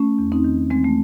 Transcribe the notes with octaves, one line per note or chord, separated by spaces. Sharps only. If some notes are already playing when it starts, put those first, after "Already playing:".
Already playing: A3 C#4
E2
C4 D#4
D#3
E3 G#3 C4
A3